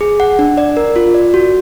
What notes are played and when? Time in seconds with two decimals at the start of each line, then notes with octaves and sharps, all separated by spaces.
0.01 G#4
0.20 F#5
0.39 D4
0.58 D5
0.77 A#4
0.96 F4
1.14 D5
1.34 F#4